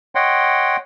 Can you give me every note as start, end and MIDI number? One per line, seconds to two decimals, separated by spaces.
0.15 0.76 73
0.15 0.76 75
0.15 0.76 78
0.15 0.76 79
0.15 0.76 84